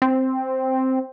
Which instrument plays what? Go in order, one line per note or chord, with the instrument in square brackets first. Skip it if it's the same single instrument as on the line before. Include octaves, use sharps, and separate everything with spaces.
[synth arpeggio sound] C4